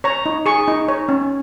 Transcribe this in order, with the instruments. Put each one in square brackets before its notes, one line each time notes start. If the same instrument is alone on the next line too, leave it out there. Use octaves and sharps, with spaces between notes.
[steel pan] C#5 A#5
D#4
G#4 C#6
D#4
C#5
C#4